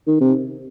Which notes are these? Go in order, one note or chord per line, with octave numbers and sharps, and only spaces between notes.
D#3
C3